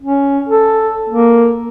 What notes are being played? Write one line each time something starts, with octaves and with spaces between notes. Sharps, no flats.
C#4
A4
A#3